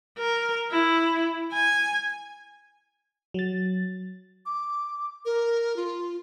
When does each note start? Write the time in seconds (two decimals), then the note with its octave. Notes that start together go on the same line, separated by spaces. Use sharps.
0.19 A#4
0.72 E4
1.53 G#5
3.34 F#3 A6
4.46 D6
5.25 A#4
5.76 F4